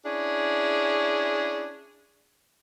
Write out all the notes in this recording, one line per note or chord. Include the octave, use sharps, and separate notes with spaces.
C#4 D4 E4 G#4